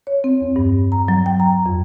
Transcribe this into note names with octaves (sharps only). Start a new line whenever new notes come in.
C#5
C4
E2
G2
A#5
F#3
G5
A#5
F2